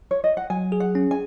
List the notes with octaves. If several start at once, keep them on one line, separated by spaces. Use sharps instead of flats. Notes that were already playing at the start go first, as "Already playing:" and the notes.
C#5
D#5
F#5
F#3 G#5
G#4
F#5
C#4
G#5